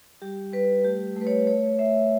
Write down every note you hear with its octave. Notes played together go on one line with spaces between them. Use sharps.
G3 G4
G3 B4
A3 G4
A3
B4
C#5
A3 C#5
A3 E5